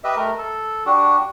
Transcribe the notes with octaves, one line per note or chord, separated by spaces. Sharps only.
G4 B4 D#5 E5
A3 A#4
A4
D4 F#4 G4